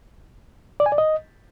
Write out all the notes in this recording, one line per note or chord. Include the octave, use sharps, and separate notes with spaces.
D5
G#5
D5
D#5